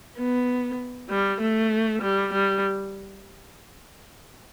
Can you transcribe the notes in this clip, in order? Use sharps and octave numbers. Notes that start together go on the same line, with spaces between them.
B3
G3
A3
G3
G3